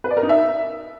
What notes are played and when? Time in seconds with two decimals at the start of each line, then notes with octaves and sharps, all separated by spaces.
0.04 B4
0.11 D5
0.17 A#4
0.23 D#4
0.29 E5